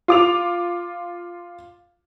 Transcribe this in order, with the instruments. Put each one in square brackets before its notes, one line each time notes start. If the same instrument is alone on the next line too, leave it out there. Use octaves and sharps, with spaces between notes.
[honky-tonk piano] F4 D6 F7